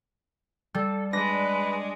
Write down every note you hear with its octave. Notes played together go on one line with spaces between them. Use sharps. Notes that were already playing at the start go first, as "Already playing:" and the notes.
G3 A4
G#3 D4 B4 A#6